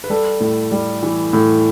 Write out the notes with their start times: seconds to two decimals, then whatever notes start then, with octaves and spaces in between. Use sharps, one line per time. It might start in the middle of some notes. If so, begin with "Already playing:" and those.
0.04 B4
0.10 G3 A4
0.40 A2
0.71 G3
1.03 E3
1.33 A2